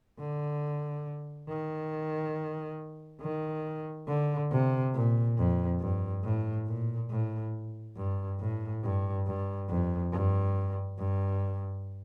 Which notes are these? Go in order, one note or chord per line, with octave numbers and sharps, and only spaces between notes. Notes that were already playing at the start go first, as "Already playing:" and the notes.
D3
D#3
D#3
D3
C3
A#2
F2
G2
A2
A#2
A2
G2
A2
G2
G2
F2
G2
G2